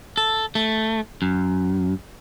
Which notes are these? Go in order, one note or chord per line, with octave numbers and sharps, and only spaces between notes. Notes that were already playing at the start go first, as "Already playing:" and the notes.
A4
A3
F#2